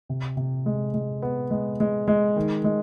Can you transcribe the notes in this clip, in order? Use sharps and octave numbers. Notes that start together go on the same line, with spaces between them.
C3
C3
G#3
G#3
B3
G#3
G#3
G#3
D#3
G#3